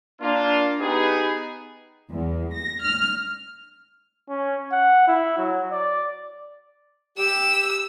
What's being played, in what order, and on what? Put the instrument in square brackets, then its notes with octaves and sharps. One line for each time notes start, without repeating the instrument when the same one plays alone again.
[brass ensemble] A#3 D4 F4
B3 D#4 G4 G#4
[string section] E2
A#6
F6
[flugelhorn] C#4
F#5
E4
F#3
D5
[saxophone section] G4 [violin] E6